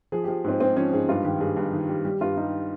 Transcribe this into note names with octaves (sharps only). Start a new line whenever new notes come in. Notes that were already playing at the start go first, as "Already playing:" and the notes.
F3 G#4
G4
F3
G#2 C4
G#2 C4
F3 C#4
G#2 G#4
G2 F4
D#3 G4
G2 G#4
G2
D#3
G3
G3 G4
G2 F4
G3 D#4